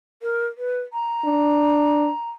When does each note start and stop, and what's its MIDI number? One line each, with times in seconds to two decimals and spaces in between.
0.22 0.47 70
0.58 0.81 71
0.93 2.30 82
1.25 2.09 62